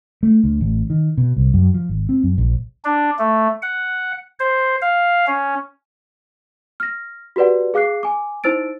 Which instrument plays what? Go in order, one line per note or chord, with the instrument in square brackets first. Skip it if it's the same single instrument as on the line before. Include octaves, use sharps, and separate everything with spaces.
[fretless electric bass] A3
D2
A1
D#3
B2
C2
F#2
F3
G#1
C4
F#2
A#1
[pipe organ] D4
A3
F#5
C5
F5
C#4
[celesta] F6 A#6
F#4 G4 B4 D5 F#5
G#4 F5 D6 F#6 C7
G#5 D6
D#4 E4 C5 E6 A6 D7